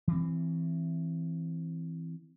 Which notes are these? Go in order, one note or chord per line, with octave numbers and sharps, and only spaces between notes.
E3 C4